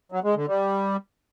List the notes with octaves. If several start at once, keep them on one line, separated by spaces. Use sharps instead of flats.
F#3
G#3
D3
G3